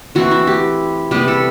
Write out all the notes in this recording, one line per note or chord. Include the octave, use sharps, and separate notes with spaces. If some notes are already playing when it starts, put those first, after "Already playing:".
E3 A3 C4 E4 F#4
E4
G4
C3 G3 B3 G4
A4